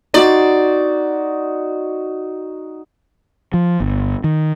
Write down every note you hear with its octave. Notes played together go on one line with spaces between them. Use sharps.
D#4 F#4 D5 C6
F3
G1
D#3